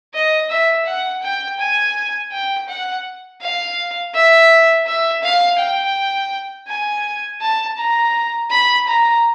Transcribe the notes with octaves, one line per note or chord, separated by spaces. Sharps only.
D#5
E5
F#5
G5
G#5
G5
F#5
F5
E5
E5
F5
G5
G#5
A5
A#5
B5
A#5